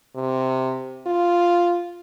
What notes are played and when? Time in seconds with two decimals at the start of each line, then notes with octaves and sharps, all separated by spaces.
0.15 C3
1.06 F4